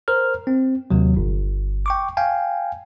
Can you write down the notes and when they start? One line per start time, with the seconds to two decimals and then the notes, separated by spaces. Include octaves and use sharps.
0.08 A#4 C5 F6
0.47 C4
0.91 D#2 C3 F#3
1.17 G1
1.86 G5 C#6 D6
2.17 F5 G5 G#5